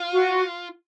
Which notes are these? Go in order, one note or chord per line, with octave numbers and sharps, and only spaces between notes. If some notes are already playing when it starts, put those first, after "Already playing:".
Already playing: F4
F#4